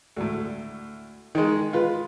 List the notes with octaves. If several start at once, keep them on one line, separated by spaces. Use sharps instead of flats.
D2 A2
D#3 G#3
F4 B4